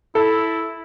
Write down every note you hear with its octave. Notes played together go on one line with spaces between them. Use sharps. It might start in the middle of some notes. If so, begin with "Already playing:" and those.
E4 A4